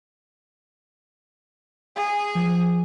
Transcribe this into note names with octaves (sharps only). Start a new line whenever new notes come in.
G#4
F3